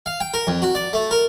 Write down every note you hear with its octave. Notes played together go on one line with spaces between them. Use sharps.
F5
G5
A#4
F2
F#4
D5
A3
A#4